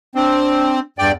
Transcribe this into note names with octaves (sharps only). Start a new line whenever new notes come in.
C4 D4
E2 G2 D5 G5